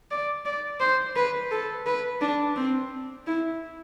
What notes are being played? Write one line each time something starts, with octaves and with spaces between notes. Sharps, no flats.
D5
D5
C5
B4
A4
B4
D4
C4
E4